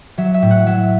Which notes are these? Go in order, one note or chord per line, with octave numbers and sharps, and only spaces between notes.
F#3 E5
E5
A2
F#5
F#3 E5